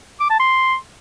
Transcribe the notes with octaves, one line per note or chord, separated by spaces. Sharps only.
D6
A5
C6